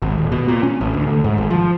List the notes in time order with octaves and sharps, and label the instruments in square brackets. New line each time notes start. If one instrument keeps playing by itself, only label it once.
[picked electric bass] G#1
D#1
B2
A#2
C#4
A1
D2
D2
G#2
G#1
F3